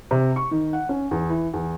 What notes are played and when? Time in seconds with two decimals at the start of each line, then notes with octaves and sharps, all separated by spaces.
0.11 C3
0.36 C#6
0.51 D#3
0.73 F#5
0.89 C#4
1.11 E2
1.30 E3
1.54 E2